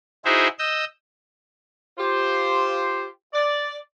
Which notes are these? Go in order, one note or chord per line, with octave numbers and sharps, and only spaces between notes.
D#4 E4 F#4 G#4 C5 E5
D#5 E6 G6
F4 G4 C5
D5